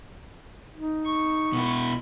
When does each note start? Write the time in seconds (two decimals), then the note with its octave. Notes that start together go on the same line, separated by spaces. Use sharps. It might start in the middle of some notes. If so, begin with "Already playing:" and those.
0.75 D#4
1.06 C#6
1.53 B2 E4